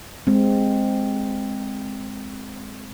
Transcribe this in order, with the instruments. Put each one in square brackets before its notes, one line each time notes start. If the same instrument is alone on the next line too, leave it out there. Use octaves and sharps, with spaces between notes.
[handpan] G#3 C4